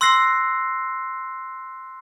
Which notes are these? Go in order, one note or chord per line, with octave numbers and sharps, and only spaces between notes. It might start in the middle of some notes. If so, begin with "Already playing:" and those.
C6 E6 F#6 A#6 C7